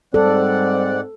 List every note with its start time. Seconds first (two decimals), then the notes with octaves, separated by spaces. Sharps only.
0.14 G#2 G3 C4 A4 D5 F#5